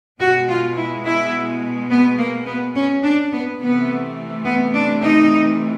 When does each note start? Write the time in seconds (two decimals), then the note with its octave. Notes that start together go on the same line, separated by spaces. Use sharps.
0.20 B2 G#3 F#4
0.48 F4
0.76 E4
1.05 E4
1.90 B3
2.18 A#3
2.46 B3
2.75 C#4
3.03 D4
3.32 B3
3.59 C3 E3 A3 B3
4.44 B3
4.74 D4
5.02 D#4